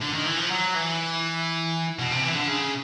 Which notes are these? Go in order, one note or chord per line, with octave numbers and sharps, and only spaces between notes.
D3
D#3
E3
F3
F#3
E3
B2
C3
E3
D3
C#3